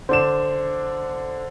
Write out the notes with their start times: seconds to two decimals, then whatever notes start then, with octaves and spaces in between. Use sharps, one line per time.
0.09 D3 D4 C5 E7